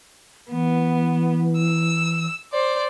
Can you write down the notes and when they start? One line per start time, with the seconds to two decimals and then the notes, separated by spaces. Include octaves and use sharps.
0.51 E3 B3
1.57 E6
2.53 C5 D5